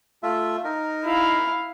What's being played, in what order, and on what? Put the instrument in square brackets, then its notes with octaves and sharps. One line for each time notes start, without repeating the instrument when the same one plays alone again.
[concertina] A3 F4 E5
D#4 A#4
[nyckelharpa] E4 F5